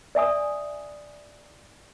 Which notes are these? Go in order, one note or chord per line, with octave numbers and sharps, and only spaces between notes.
D5 E5 G#5 D#6